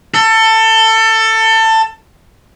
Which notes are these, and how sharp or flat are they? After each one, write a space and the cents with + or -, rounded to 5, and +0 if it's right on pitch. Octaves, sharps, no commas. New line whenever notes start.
A4 +20